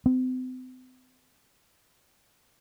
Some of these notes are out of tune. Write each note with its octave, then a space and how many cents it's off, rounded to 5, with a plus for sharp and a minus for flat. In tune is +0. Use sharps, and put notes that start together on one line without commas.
C4 -40